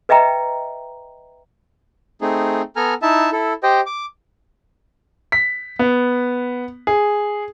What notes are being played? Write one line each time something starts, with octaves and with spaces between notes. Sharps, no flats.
B4 D#5 E5 G5 A#5
A3 C4 D#4 G#4
B3 A4 G#5 A#5 F6
D#4 E4 E5 A5
E4 A4
G4 C5 D#5 G5
D6
B6
B3
G#4